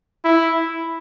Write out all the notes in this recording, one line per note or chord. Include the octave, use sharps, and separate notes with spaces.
E4